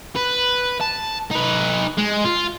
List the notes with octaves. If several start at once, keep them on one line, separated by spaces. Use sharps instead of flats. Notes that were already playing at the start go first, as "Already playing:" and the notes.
B4
A5
D#4 B4
G#3
F4